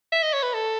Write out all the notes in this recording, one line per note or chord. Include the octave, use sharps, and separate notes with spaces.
E5
D#5
C#5
B4
A4